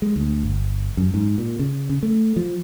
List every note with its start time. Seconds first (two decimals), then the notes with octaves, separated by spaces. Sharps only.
0.02 G#3
0.16 D2
0.44 G1
0.97 F#2
1.14 G#2
1.38 A#2
1.59 C#3
1.89 C#3
2.03 A3
2.36 F3